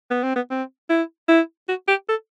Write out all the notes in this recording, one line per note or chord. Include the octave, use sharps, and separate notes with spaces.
B3
C4
B3
C4
E4
E4
F#4
G4
A4